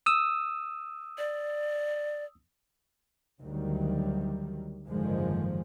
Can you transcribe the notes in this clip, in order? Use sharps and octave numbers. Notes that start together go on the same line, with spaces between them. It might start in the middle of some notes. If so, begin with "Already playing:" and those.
D#6 E6
D5
D2 D#3 F#3 G3
F#1 G#2 D3 D#3 F3 G#3